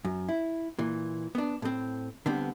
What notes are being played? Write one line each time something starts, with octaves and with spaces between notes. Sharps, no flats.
F#2
E4
A#2 E3
B3 D4
A2 C4
D3 G3 B3 C4